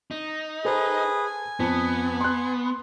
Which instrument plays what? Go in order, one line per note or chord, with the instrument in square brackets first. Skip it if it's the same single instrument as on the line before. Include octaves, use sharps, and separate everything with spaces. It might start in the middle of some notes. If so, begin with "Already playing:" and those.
[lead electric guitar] D#4
[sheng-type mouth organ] G#4 B4 [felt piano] A4 C5
[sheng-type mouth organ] G#5
[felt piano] F2 [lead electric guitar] B3
[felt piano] C6 F#6